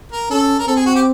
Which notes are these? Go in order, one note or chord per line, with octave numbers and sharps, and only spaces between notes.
A#4
C#4 A4
A#4
C4 A4
G#4
F#4
G4